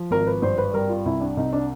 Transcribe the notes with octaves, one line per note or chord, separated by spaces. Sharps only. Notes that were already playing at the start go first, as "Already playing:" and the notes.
Already playing: F3
G#1 A#4
B4
G2 C5
B4
G3 A#4
F4
C2 E4
D4
C2 D#4
D4